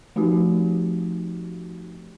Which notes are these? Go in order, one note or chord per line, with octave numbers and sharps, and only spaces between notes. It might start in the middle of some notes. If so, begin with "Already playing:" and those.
F3 A3 C4 D#4 F#4 G4